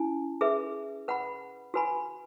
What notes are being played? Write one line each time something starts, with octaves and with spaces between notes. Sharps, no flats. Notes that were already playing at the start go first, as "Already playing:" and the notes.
Already playing: C#4 E4 G#5
G#4 B4 E5
B4 F#5 B5
F#4 B4 G#5 B5